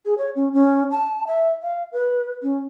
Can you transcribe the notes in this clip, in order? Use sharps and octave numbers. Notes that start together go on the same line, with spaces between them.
G#4
C#5
C#4
C#4
A5
E5
F5
B4
C#4